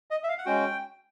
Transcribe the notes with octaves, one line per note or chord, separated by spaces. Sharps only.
D#5
E5
F5
F#5
G#3 C#4 F#4 G5